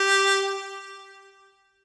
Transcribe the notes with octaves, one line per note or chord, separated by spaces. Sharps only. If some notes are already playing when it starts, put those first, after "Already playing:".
Already playing: G4